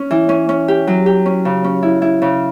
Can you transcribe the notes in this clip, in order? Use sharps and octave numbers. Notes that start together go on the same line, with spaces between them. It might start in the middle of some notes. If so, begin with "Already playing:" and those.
Already playing: C#4
E3
C#4
C#4
G4
F#3
G4
C#4
C#3
C#4
E4
E4
C#3